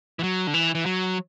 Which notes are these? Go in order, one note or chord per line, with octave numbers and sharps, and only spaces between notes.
E3
F#3
D3
E3
E3
F#3